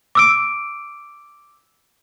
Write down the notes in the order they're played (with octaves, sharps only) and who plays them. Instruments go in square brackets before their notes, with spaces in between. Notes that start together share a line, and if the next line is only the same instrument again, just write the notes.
[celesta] D6 E6 D7